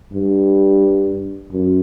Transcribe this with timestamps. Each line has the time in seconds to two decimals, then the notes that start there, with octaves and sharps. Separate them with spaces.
0.13 G2
1.52 F#2